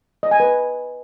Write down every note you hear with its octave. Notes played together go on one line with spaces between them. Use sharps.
D#5
G#5
B4